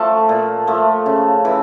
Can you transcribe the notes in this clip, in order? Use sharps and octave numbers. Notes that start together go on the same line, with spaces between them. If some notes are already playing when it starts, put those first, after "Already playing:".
Already playing: F3 A3 A5
A#2
F3 A3
C#3
E3